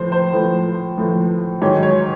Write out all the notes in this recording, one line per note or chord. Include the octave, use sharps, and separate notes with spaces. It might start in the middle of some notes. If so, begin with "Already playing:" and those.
Already playing: A2 F3 C5
C5
A2 F3
A2 F3
G#2 D#3 F#3 C#5
C#5